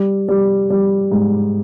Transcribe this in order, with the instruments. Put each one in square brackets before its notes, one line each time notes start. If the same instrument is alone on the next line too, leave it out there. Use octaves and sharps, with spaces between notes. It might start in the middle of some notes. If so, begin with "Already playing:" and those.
Already playing: [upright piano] G3
G3
G3
G#2